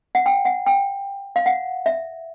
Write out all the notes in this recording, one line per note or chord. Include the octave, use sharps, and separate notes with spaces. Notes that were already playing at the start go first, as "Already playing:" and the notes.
F#5
G5
F#5
G5
F5
F#5
E5